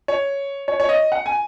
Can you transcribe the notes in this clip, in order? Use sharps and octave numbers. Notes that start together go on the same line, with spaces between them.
C#5
C#5
C#5
D#5
F#5
G#5